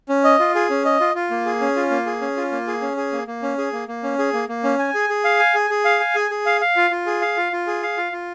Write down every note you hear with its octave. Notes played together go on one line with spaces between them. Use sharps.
C#4
D#5
F4
G#4
C#4
D#5
F4
F4
A#3
G#4
C#4
F4
A#3
G#4
C#4
F4
A#3
G#4
C#4
G#4
A#3
A#3
C#4
G#4
A#3
A#3
C#4
G#4
A#3
A#3
C#4
G#5
G#4
G#4
F5
G#5
G#4
G#4
F5
G#5
G#4
G#4
F5
F5
F4
F4
G#4
F5
F4
F4
G#4
F5
F4
F4